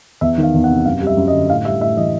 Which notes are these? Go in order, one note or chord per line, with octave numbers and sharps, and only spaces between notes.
E2 E5
D#3
F5
E2
F#5
C3
F#2 F5
G3
E5
F#2
D#5
D3
A2 F5
G3 E5
A2 E5
E3 D#5